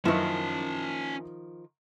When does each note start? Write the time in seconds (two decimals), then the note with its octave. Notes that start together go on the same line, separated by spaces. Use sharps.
0.05 F#2 D#3 F3 C#4 E4 B4 A5